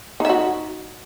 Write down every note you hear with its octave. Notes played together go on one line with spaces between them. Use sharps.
D#4 F#4 E5